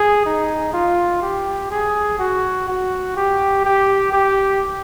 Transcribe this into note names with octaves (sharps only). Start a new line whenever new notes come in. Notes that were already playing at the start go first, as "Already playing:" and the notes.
Already playing: G#4
D#4
F4
G4
G#4
F#4
F#4
G4
G4
G4